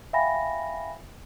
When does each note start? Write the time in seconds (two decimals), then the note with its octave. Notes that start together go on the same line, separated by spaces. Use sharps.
0.13 E5 F5 G5 G#5 B5 A#6